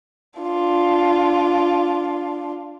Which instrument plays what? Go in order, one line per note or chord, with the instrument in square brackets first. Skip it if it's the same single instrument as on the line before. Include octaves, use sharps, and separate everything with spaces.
[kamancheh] D4 F4